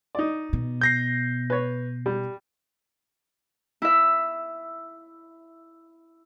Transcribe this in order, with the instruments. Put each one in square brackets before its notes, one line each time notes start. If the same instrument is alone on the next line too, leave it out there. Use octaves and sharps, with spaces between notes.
[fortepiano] D#4 D5
[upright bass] B2
[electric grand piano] G6 A#6 C7
[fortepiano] B4 C#5
G3
[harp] E4 E5